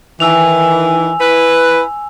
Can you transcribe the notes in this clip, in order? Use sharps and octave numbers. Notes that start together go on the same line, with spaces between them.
D#3 E3 G#5 E6 F7
E4 B4